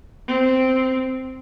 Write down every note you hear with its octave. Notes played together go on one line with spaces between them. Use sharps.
C4